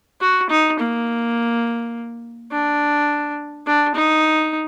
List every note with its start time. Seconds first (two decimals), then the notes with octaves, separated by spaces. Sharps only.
0.21 F#4
0.50 D#4
0.79 A#3
2.52 D4
3.67 D4
3.95 D#4